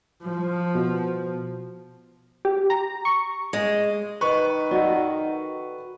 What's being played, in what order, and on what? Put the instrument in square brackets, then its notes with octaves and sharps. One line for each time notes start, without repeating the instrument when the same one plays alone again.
[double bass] F3
[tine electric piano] B2
[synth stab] G4
A#5
C#6
[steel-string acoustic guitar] G#3
[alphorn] D#3 [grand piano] B4 C#6 [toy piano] C5 D#5
[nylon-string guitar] F#4 A4 [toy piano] D5 D#5